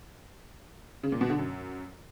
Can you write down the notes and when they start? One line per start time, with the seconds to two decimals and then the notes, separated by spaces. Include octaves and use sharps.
1.03 C#3
1.12 A#2
1.21 B2
1.30 D3
1.38 F#2